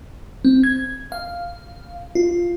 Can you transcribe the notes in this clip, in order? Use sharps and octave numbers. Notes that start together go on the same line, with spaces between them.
C4
G#6
F5
F4